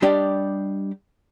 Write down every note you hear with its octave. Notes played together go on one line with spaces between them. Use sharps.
G3 D4 G4 D#5